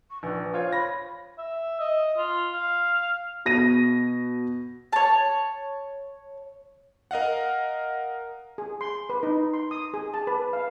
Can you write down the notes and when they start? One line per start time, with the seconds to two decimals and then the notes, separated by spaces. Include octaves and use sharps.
0.10 C#6
0.23 A#1 B4
0.54 F4 C5 C#5
0.72 B5 A#6
1.38 E5
1.80 D#5
2.17 F4
2.54 F5
3.45 B2 A#6 D#7
4.93 C#5 A5
7.11 A#4 D#5 F5 F#5
8.58 G#4
8.81 C6
9.10 B4
9.23 D#4
9.53 C6
9.71 D#6
9.94 G#4
10.14 A5
10.27 B4
10.53 F5